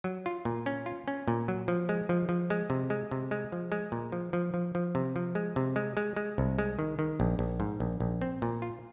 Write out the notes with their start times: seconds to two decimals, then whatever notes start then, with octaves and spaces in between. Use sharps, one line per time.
0.04 F#3
0.26 F4
0.45 A#2
0.66 C#4
0.86 F4
1.08 C#4
1.28 A#2
1.48 F#3
1.68 F3
1.89 G#3
2.09 F3
2.29 F3
2.50 G#3
2.70 C3
2.90 G#3
3.11 C3
3.31 G#3
3.52 F3
3.72 G#3
3.92 A#2
4.12 F3
4.33 F3
4.54 F3
4.75 F3
4.95 C3
5.16 F3
5.35 G#3
5.56 C3
5.76 G#3
5.97 G#3
6.16 G#3
6.38 C2
6.59 G#3
6.79 D#3
6.99 D#3
7.20 A#1
7.39 A#1
7.60 G#2
7.80 A#1
8.00 A#1
8.22 C4
8.42 A#2
8.62 F4